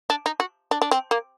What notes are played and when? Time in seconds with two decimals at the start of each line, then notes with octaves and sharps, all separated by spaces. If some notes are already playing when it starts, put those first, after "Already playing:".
0.10 D4
0.26 D#4
0.40 F#4
0.71 D4
0.82 D4
0.91 C4
1.11 A#3